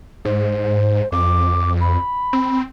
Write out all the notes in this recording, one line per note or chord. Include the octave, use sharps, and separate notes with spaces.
G#2 C5
F2 D6
B5
C4